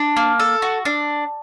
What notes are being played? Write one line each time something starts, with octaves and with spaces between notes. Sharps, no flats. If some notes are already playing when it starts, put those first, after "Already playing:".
Already playing: D4
A#3
A4
F#4
D4